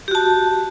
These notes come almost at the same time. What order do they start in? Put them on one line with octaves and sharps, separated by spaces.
G4 F#4 A5